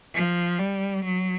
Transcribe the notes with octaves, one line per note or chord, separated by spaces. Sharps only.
F3
G3
F#3